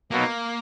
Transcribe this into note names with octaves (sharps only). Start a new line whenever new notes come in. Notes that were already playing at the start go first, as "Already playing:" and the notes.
B2 F#3 A#3 B3 D#4